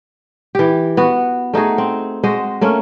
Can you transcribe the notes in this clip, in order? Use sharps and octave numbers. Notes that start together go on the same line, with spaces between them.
E3 G4
B3 F#4
A3 D#4 F#4 G#4
C4
G#3 F#4 C5 D#5
A3 A#3 C#4